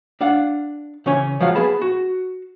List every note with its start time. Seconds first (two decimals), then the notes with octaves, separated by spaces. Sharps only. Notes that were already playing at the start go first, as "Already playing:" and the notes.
0.21 D4 F5 F#5
1.06 C#3 E3 C#4 G#5
1.40 F3 F#3 G#3 F5 F#5
1.55 B3 G#4 A5 B5
1.82 F#4